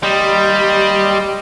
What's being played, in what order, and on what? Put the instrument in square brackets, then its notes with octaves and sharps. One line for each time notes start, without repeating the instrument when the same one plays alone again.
[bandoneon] D#2 D#5 C6 [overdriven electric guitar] G3